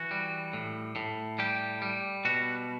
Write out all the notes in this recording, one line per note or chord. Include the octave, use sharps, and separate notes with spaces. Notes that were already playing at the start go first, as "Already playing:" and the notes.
Already playing: E3 F#4
G3
A2
A2
G3 G4
G3
B2 F#4